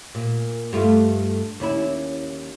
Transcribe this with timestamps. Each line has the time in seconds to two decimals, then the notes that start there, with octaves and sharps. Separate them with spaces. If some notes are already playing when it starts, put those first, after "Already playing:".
0.15 A#2
0.73 G2 A3 F4
1.60 D#2 C#4 E4